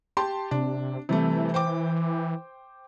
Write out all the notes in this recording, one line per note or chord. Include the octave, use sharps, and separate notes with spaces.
G4 A5 C6
C3 D4
C3 E3 G3 A3
C5 G5 D6